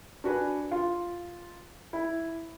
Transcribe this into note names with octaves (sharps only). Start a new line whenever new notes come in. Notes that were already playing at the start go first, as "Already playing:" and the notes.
D4 F#4 B4 G#5
F4
E4